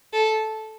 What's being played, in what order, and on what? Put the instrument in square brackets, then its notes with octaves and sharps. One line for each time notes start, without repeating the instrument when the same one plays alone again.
[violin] A4